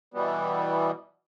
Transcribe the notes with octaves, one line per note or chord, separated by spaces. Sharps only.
B2 E3 G3 B3